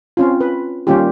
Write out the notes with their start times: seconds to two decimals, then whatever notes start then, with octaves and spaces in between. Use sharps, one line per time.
0.17 C4 C#4 F4
0.41 B4
0.87 D#3 G3 A#3 C#4 F4 G4